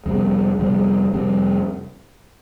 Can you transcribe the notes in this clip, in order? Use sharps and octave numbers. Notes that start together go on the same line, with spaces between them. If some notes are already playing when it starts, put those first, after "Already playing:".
F2 C3 G3 B3
F2 C3 G3 B3
F2 C3 G3